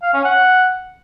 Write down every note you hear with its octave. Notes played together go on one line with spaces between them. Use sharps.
F5
C#4
F#5